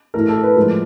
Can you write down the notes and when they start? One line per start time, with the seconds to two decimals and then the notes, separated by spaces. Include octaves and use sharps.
0.14 A2 E3 A3 A#4
0.28 A4
0.43 B4
0.56 A2 F3 G#3 A#4